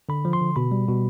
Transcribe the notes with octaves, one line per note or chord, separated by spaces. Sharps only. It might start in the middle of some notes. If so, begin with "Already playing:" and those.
D3 B5
F3
C6
D3
B2 B5
G3
B2